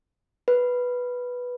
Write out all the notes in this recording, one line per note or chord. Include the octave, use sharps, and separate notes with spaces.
B4